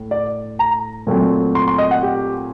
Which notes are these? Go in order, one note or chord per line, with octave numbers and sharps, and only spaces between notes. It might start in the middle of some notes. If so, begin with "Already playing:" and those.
Already playing: A2
D5
A#5
A#2 F#3 A3 C4
C6
C6
D#5
F#5
G4